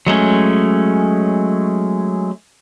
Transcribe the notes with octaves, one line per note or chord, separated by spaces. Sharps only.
F#3 G#3 A3 C#4